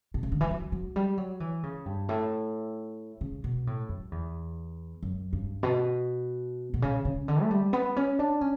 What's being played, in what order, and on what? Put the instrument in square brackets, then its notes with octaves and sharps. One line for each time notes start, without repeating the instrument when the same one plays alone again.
[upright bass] B2
C#3
D3
E3
F#3
F#3
G3
F#3
E3
C#3
G2
A2
C#3
B2
A2
F#2
E2
F#2
G2
B2
B2
C#3
C#3
D3
A3
G3
B3
C#4
D4
C#4